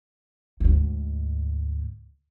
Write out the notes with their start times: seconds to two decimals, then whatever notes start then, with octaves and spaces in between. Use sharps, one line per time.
0.60 D2 G#2